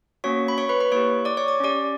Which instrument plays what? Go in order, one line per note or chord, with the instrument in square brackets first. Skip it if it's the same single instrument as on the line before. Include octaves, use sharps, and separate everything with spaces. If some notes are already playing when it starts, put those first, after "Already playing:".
[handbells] A#3 C#4 F#4 C#5 C#6
B5
C#5 C#6
B4 B5
B4 B5
A#3 E4 G4 C#5 C#6
D5 D6
C#5 C#6
D6
C#4 G4 D5 D6